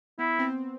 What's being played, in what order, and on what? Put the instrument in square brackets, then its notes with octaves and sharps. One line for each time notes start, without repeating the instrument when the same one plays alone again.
[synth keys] B3 [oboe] E4
[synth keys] C4